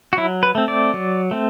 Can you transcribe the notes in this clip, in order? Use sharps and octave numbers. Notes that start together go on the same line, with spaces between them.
F#4
F#3 E4
B4
A3 C4
D5
F#3
A3 C4